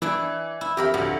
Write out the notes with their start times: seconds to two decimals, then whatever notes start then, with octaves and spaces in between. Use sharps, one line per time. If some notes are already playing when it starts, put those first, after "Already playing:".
0.02 E3 D4 E4
0.61 E4
0.77 F2 G4 A#4 E5 B5
0.94 D2 A2